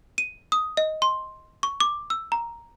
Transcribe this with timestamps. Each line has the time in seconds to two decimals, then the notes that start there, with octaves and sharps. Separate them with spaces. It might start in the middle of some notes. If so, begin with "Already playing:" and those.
0.18 D#7
0.52 D#6
0.77 D#5
1.02 C6
1.63 C#6
1.80 D6
2.10 E6
2.32 A#5